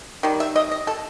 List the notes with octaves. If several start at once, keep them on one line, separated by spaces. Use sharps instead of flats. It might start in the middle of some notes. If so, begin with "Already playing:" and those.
D#3 G3
E5
D#5
D#5
A4